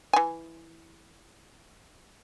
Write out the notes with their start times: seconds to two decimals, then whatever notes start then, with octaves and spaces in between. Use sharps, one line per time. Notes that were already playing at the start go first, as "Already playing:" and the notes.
0.13 E3 G#5